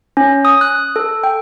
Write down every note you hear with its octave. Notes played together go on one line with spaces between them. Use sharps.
C#4
D#6
F#6
A4
G5